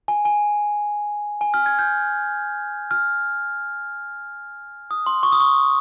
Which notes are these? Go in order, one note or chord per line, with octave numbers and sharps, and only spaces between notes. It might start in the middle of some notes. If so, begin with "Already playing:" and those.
G#5
G#5
G#5
F6
G#6
G6
F6
D#6
C6
C#6
D#6
C#6